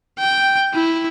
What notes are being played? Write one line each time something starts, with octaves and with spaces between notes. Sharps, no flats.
G5
E4